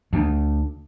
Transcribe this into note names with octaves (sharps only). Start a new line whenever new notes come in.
D2